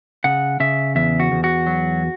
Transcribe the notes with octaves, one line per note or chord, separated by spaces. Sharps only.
C#3 F#5
C#3 E5
E2 E5
F#4
E2
F#4
F#3